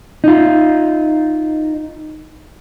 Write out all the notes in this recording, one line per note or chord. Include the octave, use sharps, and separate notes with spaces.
D#4 F4